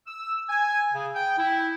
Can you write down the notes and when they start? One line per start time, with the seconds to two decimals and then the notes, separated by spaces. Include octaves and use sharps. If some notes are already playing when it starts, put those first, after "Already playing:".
0.07 E6
0.49 G#5
0.93 C#3
1.14 G5
1.38 E4